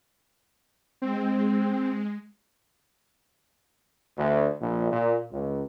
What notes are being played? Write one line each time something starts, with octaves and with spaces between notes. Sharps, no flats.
G#3 C4
D2
A#1
A#2
C#2